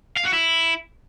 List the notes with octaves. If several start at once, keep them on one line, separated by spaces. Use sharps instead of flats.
F5
F#4
E4